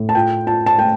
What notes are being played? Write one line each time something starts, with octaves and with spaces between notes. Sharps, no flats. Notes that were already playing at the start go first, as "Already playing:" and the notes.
Already playing: A2
A5
F4 G5
F4 A5
A5
A3 G5